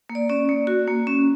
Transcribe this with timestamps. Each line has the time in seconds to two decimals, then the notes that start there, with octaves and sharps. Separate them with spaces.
0.10 A#3
0.15 D5
0.29 C#4 D5
0.49 A#3
0.67 F#4
0.87 A#3
1.07 C#4